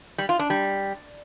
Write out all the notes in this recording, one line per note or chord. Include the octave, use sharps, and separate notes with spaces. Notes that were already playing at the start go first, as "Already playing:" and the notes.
G3
F4
D4
G3